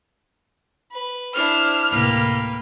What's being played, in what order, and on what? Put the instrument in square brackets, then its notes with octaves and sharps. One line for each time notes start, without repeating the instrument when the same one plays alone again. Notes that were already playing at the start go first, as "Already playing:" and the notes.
[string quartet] B4
[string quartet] D4 E4 C5 [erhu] F6
[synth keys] D2 A2 C3 [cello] A#3 [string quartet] B4 G5